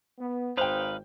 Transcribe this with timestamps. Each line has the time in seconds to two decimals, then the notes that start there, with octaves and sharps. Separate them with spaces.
0.19 B3
0.57 G#1 D#4 B4 C5 F5 G5